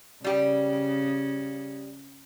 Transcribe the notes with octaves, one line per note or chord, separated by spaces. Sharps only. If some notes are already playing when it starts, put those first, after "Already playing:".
C#3 G3 G4